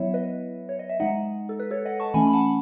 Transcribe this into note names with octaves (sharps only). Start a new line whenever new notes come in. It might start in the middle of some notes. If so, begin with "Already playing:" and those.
Already playing: F#3 B3 E4 C#5 E5
B4 D#5
C#5
D#5
E5
G#3 D#4 D#5 F#5
A4
B4
A4 C#5
D#5 F#5
A5 C#6
E3 A3 C#4 G#5 B5
B5
F#5 A5